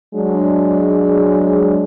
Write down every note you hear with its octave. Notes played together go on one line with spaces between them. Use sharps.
F#3 G#3 D4